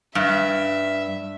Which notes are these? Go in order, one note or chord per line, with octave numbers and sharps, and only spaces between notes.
G2 E5